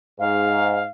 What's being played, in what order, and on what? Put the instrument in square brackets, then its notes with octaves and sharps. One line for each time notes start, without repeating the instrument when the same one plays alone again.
[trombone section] G#2 [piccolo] F5